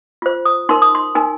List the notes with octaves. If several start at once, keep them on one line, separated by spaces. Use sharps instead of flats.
F4 C5
D#6
D#4 A#4 C6
D#6
C6
D#4 A#4 G#5